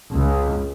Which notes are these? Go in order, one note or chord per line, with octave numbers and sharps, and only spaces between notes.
C#2